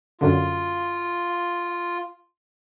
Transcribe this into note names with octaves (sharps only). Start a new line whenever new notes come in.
F#2 D3 F4